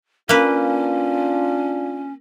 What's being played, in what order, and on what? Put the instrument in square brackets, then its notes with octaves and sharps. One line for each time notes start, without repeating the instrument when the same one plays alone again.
[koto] A#3 B4 [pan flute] C#4 [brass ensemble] D4 F4